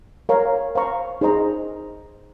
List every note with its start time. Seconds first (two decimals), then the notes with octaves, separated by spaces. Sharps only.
0.29 A#4 C#5 F5 A#5
0.75 C5 F5 A#5 C#6
1.21 D#4 G#4 C5 D#5 A#5